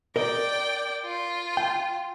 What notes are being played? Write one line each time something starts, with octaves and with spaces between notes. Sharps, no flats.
A#4 D5 D#5 G5
F4
G5